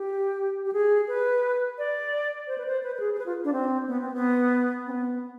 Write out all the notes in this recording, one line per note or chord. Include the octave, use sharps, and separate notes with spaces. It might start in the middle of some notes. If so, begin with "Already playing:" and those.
Already playing: G4
G4
G#4
B4
D5
C5
B4
C5
B4
B4
G#4
G#4
B4
F4
D4
C4
B3
C4
B3
C4
B3